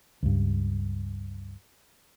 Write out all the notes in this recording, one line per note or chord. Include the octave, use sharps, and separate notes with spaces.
C#2 G2